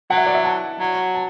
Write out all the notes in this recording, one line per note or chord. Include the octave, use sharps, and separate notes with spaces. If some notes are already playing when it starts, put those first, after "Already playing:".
F#3 F#5
E5
D5
E5
A5
F#3
A5